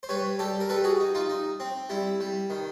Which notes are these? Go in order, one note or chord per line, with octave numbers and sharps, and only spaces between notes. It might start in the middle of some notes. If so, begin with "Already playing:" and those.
C5
G3 B4 C#5
G3 G4 A4
A#4
G3 A4 B4
F#4 G#4
D#4
D#4 F4
D#4
C4
G3 E4
G3
D#3